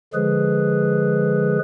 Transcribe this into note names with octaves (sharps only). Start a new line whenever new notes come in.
D3 F3 G#3 G#4 B4